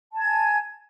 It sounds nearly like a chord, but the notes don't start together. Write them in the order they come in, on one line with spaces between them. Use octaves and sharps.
A5 G#6 G#5